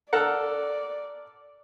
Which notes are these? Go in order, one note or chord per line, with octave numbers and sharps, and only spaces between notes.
A4 A#4 D5 F#5